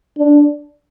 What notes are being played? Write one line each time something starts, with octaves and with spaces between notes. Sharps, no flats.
D4